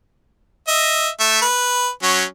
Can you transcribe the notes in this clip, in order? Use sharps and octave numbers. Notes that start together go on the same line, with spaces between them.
D#5 E5
A3 E5
B4
F#3 C#4